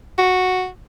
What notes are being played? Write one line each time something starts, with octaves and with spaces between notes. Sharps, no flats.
F#4